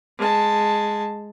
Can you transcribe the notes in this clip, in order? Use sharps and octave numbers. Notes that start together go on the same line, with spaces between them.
G#3 A5